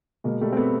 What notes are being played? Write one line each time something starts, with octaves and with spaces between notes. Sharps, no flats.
B2 G#3 A#3
G3 A3
C4
A3 B3